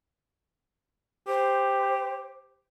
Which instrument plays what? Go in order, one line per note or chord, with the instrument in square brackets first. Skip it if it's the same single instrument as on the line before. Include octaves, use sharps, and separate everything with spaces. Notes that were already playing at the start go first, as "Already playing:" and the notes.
[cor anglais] G4 [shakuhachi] C5